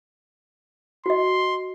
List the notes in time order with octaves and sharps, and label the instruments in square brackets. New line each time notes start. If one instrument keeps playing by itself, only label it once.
[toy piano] F#4 D#5 [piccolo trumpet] C6